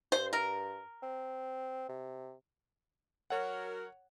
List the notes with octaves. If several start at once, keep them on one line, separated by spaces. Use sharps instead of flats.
G2 C5
A#4
C4
C3
F#3 F#4 A#4 C#5 F#5